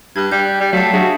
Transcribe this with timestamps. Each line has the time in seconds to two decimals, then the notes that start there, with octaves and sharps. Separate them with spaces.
0.16 G2 F#6 G#6
0.31 G3 G6
0.60 G3
0.73 F#3 A3 F5 A5
0.94 D4 F#4 G#4 E5